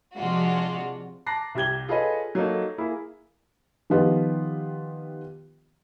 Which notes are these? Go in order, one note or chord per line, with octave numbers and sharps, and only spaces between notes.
C3 F3 G#3 D4 F4 F#4
A5 A#5 D6 F#6 A#6 C7
C2 G4 G#6 G7
F4 G#4 A4 B4 C#5 D#5
F#3 A#3 D#4 A4
A#3 E4 G#4
D#3 F3 B3 F4 G4